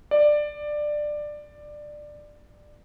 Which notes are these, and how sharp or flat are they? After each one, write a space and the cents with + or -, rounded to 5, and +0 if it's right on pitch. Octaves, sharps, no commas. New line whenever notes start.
D5 +15